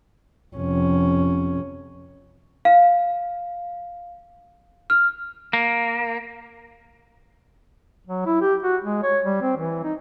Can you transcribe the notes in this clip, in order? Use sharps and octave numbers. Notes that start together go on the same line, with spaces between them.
F1 C#4
F5
F6
A#3
F#3
E4
G4
F#4
G#3
C#5
G3
C4
E3
D#4